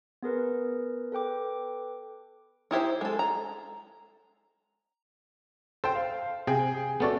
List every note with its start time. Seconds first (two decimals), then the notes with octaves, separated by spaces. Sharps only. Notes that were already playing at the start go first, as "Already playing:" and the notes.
0.22 B3 G#4 A#4 B4
1.12 A4 B4 G5 D6
2.71 D#4 E4 G4 C5
3.01 G#3 A4
3.19 A#5
5.84 A4 C5 G5
5.95 F5
6.47 C3 G#4 G5
7.00 A3 B3 C#4 F#4 A4 D5